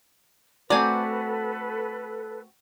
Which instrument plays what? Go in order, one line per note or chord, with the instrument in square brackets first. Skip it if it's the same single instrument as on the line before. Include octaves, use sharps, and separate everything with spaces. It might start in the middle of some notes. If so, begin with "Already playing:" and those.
[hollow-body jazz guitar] A3 A#5 [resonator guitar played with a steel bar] C4 F#4 [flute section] A4 B4 [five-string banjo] D5 G#5